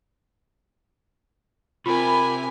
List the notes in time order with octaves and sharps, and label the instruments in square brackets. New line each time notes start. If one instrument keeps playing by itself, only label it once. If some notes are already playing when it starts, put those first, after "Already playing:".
[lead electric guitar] C3 [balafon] F4 [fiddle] A#4 G#5 [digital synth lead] B5